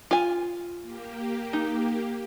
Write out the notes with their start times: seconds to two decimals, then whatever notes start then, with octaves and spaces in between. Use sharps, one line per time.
0.11 F4 G#5
0.82 A#3 G4
1.53 D#4